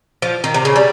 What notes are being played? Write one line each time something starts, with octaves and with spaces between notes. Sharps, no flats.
F3
D#3
C3
C#3
G3